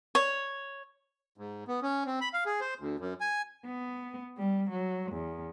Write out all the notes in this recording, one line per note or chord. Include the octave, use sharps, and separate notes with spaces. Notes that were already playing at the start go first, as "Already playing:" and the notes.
C#5
G#2
B3
C#4
C4
B5
F5
G#4
C5
D2
F#2
G#5
B3
G3
F#3
E2